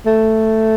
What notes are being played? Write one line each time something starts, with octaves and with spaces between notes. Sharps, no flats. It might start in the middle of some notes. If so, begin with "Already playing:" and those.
A3